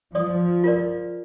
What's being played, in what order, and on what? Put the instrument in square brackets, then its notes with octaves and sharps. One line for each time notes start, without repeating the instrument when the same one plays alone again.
[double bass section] F3 [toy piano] D5 D#6
[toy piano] F4 A#4 D5